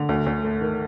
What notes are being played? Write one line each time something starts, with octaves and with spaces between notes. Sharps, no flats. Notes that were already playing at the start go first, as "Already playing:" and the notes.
Already playing: D3
D2
D2
A3
D#3